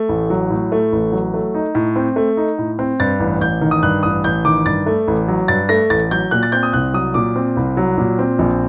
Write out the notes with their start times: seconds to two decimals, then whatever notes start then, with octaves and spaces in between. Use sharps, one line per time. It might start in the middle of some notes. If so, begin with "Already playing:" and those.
Already playing: A3
0.09 A1
0.30 F#3
0.50 A2
0.72 A3
0.92 A1
1.12 F#3
1.34 A3
1.54 D#4
1.75 A2
1.96 C4
2.16 A3
2.37 D#4
2.58 A2
2.79 C4
3.00 G2 A6
3.20 A1
3.41 A1 G6
3.61 D#3
3.71 D#6
3.83 G2 F#6
4.03 A1 D#6
4.24 A1 G6
4.45 D#3 D6
4.65 G2 A6
4.86 A3
5.08 A1
5.28 F#3
5.48 G2 A6
5.69 A3 A#6
5.90 A1 A6
6.11 F#3 G6
6.31 A#2 F#6
6.43 A6
6.52 C4 G6
6.63 D#6
6.73 C2 F#6
6.94 F#3 D#6
7.14 A#2 D6
7.36 C4
7.57 C2
7.77 F#3
7.98 A#2
8.19 C4
8.39 A#1